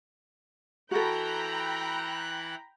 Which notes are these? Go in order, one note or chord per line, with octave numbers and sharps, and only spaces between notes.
E3 E4 F#4 A4 G5 A#5 B5 F#6